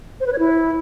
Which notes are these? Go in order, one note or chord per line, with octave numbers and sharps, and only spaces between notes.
C5
B4
C#5
E4